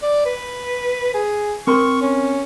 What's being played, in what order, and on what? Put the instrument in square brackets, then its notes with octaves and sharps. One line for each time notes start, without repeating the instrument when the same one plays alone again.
[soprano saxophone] D5
B4
G#4
[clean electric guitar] C4 A#4 C6 [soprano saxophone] C#6
[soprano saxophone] C#4